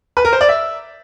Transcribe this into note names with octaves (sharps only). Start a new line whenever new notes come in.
B4
A#4
C5
D5
E5